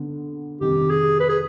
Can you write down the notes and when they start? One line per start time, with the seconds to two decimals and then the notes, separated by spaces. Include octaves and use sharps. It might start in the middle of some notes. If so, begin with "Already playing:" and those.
Already playing: D3 B3
0.61 F2 C3 D#3 G4
0.90 G#4
1.20 B4
1.29 G#4